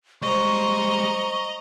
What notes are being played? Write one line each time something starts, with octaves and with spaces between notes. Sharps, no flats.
G3 G#3 C5 D#5 A#5 C#6